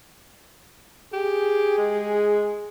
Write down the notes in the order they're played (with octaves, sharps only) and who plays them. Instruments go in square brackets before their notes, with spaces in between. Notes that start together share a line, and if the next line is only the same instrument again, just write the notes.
[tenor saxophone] G4 [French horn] G#4
[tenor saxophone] G#3